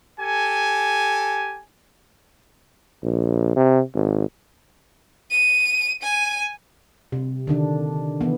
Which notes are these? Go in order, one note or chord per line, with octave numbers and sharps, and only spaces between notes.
G4 A4 G#5
A#1
C3
G#1
D#7
G#5 D#7
C3
D3 D#3 D4
E3 B3